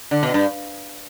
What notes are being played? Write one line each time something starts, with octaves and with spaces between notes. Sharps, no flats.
D3
B2
G2